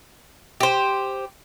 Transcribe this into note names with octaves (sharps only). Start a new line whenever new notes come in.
G4 C5